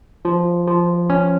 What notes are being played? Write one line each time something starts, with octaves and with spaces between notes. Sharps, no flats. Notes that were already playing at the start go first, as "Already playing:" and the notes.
F3
F3
C#4